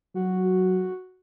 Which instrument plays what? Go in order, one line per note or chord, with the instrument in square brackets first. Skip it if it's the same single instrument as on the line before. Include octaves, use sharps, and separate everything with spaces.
[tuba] F#3 [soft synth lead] F#4